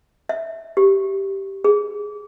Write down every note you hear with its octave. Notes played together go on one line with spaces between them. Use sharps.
E5
G4
G#4